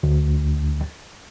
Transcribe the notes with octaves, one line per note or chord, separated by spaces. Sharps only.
D2